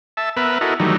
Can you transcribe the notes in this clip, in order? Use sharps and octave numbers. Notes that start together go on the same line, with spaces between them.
E5 A5
B3 A#4 B4 E5
E4 F#4 A4 A#4 D#5
D#3 E3 F#3 G3 A3 D#4